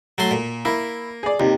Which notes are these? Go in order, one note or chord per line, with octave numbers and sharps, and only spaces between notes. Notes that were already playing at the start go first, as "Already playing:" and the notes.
F#3 A3 C6
A#2
A#3 E4
G#4 D5
D#2 C3